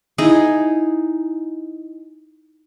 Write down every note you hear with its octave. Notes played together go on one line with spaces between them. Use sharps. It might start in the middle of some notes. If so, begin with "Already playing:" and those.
D#4 E4 G#4